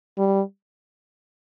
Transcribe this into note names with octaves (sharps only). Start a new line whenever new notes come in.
G3